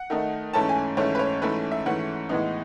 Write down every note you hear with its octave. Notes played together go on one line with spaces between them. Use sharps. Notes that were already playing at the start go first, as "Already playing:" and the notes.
Already playing: F#5
D#3 A3 D#4
G#2 E3 A3 C#4 A5
G#5
G#2 E3 A3 C#4 C#5
B4
C#5
G#2 E3 A3 C#4 B4
E5
G#2 E3 A3 C#4 F#5
A2 E3 G#3 B3 D#4